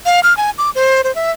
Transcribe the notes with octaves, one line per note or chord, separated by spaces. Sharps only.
F5
F6
G#5
D6
C5
C5
E5